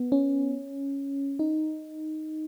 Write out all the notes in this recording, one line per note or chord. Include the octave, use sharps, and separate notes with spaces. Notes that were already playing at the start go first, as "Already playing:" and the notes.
Already playing: B3
C#4
D#4